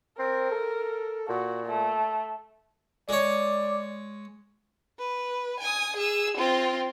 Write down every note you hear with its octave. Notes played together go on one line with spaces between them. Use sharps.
C4 A#4
A4
A#2 F#4
A3
G#3 C#5 D5
B4
G#5 D#6
G#4 E6
C4 F4